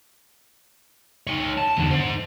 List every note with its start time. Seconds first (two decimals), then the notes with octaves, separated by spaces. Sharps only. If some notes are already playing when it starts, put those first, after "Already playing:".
1.27 D#4 C#5
1.58 A5
1.77 E2 D3
1.91 D#4 C5